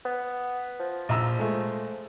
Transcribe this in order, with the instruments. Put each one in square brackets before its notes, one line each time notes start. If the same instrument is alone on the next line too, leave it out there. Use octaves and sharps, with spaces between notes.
[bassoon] B3
F3
[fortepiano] A#1 A#5 E6
G#3 A3